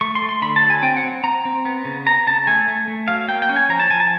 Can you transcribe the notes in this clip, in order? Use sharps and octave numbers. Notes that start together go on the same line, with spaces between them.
A3 C#6
C6
A3
C6
D3 B5
A5
F#3
G#5
C4 G5
F#5
C4
C4 A#5
C4
B3
C#3
B3 A#5
C#3 A5
A3 G#5
A3
A3
F#3 F5
A#3 G5
G5
C#4
G#5
F3 A#5
A5
F3 G#5
A5